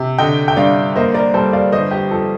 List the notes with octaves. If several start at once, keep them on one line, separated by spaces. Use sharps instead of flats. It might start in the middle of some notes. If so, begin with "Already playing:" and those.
Already playing: C3
D3 D#5 G5
G5
G2 D5 F5
A#3 C5 D#5
A#4 D5
G3 A4 C5
D5 F5
G1 C5 D#5
G4
F3 A4